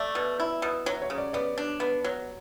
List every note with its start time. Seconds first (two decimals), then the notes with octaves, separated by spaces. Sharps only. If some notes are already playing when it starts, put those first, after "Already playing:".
Already playing: A3 D5
0.15 B2
0.40 E4
0.62 B2
0.86 F#3
1.02 C#5
1.10 C#3
1.18 D5
1.33 B3 D5
1.58 D4
1.80 B3
2.04 F#3